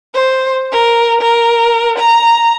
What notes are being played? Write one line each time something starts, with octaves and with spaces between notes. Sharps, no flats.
C5
A#4
A#4
A#5